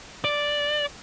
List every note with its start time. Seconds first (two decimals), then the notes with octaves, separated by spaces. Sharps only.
0.24 D5